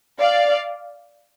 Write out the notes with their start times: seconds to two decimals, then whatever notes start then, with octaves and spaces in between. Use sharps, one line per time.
0.20 D5 F5